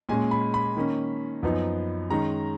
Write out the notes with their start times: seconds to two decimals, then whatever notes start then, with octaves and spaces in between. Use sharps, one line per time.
0.09 A#2 G#3 C#4 G#5
0.31 B5
0.54 B5
0.77 D#3 A#3 C#4
1.43 F#2 F3 B3 D#4
2.10 D#3 G#3 C#4 A#5